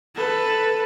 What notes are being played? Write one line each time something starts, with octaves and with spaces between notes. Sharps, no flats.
A4 B4